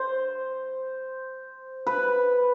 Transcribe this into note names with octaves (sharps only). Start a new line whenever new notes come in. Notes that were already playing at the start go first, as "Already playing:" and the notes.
Already playing: C5
B4